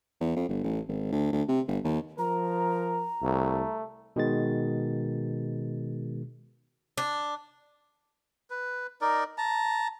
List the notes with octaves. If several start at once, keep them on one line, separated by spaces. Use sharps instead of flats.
E2
F2
G1
A1
G#1
D2
D2
C3
G1
D#2
F3 A#4 A#5
C2 A3
B2 D#3 G#3 A6
D4
B4
D#4 A#4 D5
A5 A#5